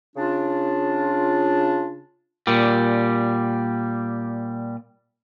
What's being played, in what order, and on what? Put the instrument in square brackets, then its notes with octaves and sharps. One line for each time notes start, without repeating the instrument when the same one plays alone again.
[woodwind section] C#3 D4 F4
[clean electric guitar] A#2 G3